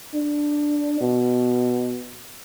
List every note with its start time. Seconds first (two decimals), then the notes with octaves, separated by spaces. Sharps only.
0.14 D4
1.01 B2